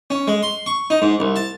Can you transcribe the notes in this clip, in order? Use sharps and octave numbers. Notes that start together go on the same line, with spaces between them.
C#4
G#3
C6
C#6
D#4
G#2
C2
A5